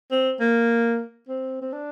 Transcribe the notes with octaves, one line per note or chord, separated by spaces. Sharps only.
C4
A#3
C4
C4
D4